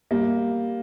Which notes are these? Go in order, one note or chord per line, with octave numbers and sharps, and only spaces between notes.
G3 A#3